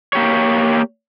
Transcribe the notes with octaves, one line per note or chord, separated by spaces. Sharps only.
A#3 G4 C#5